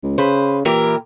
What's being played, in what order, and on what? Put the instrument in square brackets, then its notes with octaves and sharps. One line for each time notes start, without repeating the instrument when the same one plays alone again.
[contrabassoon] C#2
[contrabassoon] C#3 [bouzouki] B4 C5
[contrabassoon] A#2 [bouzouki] E3 G4 A#4